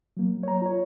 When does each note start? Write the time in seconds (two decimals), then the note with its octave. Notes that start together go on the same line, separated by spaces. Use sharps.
0.17 F#3 A#3
0.43 C#5 A#5
0.62 F4 C#5